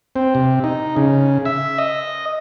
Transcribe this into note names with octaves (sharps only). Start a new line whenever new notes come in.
C4
C3
D#4
C#3
E5
D#5